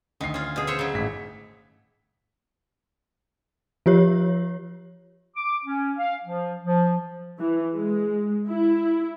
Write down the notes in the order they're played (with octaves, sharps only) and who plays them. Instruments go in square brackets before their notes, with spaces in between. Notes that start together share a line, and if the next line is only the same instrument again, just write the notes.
[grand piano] D2 C7 [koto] D#3
[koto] C#4 F4
B2 G#4
C5 C#5 E5
C#3 F#3
[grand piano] G#1 A2 B6
[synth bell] F3 F4 G4 C#5
[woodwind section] D6
C#4
F5
F3
F3
[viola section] E3
G#3
E4